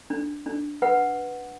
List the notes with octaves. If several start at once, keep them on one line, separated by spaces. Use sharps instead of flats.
D4
D4
B4 F#5